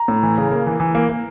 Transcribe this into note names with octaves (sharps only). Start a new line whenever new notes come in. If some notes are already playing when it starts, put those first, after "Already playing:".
Already playing: A#5
A2
E3
C#3
A#3
E3
E3
A#3
A#3